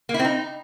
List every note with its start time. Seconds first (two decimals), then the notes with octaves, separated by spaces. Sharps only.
0.09 A#3
0.14 E4
0.19 C4
0.25 D#4